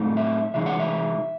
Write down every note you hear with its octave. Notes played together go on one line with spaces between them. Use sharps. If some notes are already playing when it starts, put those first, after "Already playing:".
Already playing: A2 F#3 A3 C4 D#4
E5
C3 E3 G#3 D#4 E5
F#5
E5